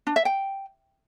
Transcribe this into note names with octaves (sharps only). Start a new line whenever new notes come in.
D4
E5
G5